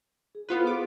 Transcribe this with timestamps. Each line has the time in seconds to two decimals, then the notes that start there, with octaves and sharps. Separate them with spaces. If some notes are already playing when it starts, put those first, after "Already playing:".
0.35 G#4
0.49 B3 E4 F4 A4 B4 C5
0.67 G#4 D6